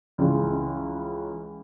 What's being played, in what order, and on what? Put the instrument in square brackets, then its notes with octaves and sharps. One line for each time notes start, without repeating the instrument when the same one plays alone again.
[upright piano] C#2 C#3 E3 G#3 C#4